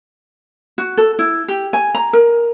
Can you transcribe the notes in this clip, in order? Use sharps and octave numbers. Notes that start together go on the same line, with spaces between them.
F#4
A4
E4
G4
G#5
A#5
A#4